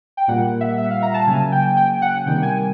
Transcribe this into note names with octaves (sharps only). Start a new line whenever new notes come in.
G5
A#2 G3 A#3 F#5
E5
E5
F5
A#5
A5
C#3 F#3 A#3 G#5
G5
G5
F#5
C3 D#3 G3 A#3 G5
G#5